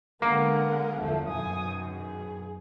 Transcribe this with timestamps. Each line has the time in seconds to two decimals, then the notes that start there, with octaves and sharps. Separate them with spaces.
0.22 D3 G#3 A#3 B3 A#4 F#5
1.00 G1 E2 F3 A3
1.28 F#2 B2 D#3 G#5 D#6
1.93 G#4